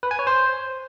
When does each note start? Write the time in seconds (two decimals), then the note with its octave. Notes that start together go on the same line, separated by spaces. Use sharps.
0.03 B4
0.11 G#5
0.19 C#5
0.27 C5